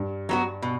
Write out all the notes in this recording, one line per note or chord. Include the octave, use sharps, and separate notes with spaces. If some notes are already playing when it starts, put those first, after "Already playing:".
Already playing: G2
F#3 B3 F#4
B2